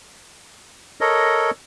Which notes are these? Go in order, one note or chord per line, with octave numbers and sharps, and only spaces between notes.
A4 A#4 C#5 D#5